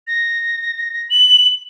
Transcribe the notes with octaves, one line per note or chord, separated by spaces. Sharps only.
A#6
F#7